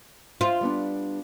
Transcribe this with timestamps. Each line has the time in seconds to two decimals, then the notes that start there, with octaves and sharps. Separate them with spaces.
0.41 F4 C5 E5
0.61 G3 B3 D4